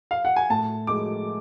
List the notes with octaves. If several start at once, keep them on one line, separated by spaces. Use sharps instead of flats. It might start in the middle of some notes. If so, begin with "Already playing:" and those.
F5
F#5
G#5
A2 A5
G#3 D6